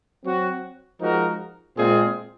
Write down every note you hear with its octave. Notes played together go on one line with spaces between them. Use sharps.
F#3 C4 F#4
F3 G#3 D#4 F#4 A#4
A#2 G#3 C4 F4 G#4